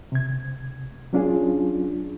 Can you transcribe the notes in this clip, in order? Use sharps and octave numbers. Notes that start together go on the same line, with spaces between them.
C3 G#6
F#3 C#4 D4 F4 G#4